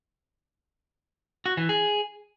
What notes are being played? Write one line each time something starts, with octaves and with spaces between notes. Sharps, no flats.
F#4
E3
G#4